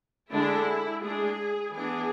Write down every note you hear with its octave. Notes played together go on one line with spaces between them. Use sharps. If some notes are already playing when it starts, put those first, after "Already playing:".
D3 G#3 D4 E4
G#3 D4 G#4
E3 B3 D4 G#4